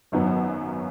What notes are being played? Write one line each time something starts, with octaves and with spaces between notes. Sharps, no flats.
G#1 F#2 D#3 F#3 B3